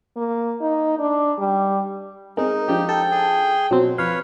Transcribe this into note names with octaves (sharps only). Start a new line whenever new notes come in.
A#3
D#4
D4
G3
G#3 C4 D#4 A#4
F3 D4 F4 G4
A4 G5
G#4
B2 F#3 C4
F2 B4 C#5 F5 B5